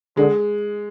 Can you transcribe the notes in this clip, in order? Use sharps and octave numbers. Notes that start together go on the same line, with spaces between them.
D3 G#3